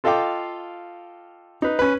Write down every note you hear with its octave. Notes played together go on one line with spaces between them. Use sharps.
F4 A4 D#5 F5 G5 D6
D#4 B4
C#4 B4